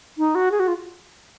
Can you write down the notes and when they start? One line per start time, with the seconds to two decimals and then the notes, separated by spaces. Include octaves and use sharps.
0.18 D#4
0.35 F#4
0.52 G#4
0.60 F#4
0.68 F4